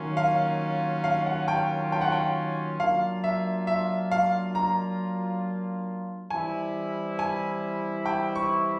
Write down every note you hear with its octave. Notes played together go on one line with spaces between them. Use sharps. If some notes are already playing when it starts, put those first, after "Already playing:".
Already playing: D#3 F#3 A#3 C#4 F4
F5
F5
F#5
G5
G5
F#5
G5
F#3 A#3 D4 F4 F5
E5
E5
F5
A#5
E3 G3 C4 E4 G#5
G#5
G5
C#6